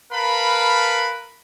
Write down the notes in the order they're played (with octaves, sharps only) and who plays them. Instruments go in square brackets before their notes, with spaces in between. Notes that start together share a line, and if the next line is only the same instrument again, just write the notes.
[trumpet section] A#4 B4 F5 A5 B5